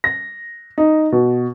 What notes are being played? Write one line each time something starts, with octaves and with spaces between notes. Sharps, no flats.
A#6
D#4
B2